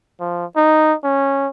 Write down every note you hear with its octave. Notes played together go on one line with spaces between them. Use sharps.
F3
D#4
C#4